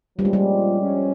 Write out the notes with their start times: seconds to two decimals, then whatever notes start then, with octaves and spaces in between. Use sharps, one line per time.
0.18 A#2 F3 G3 A#3 C#4 F4
0.25 G#3
0.33 G3
0.81 G2 F3 G#3 C#4